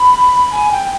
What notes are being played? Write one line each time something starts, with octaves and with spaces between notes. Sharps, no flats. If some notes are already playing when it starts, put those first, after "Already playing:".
Already playing: B5
G#5
G5